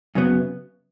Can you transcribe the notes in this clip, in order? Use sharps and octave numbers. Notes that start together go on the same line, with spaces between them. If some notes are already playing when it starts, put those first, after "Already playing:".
F#2 C#3 F#3 B3